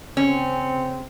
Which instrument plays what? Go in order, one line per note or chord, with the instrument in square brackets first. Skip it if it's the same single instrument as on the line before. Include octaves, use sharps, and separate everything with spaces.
[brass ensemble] C#3 C4 [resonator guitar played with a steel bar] C#4